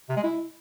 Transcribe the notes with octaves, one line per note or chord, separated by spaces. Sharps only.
C3
G#3
E4